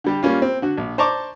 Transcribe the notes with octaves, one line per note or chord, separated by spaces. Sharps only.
D3 G3 G4
G3 A#3 C#4 F4
C4
D3 F#4
A#1
C5 D5 A5 A#5 C#6 D6